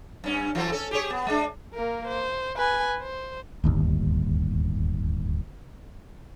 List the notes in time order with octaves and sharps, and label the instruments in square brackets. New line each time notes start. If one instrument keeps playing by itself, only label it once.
[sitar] G2 C#4
E3 F#3 A4
C#4 A4
G4 G#4 C#5
B3
G#3 D4
[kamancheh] A#3 A#4
C5
B4 G#5
C5
[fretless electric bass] D1 G1 D#2